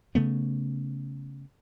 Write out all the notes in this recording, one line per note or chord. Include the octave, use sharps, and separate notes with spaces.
C#3 A3 B3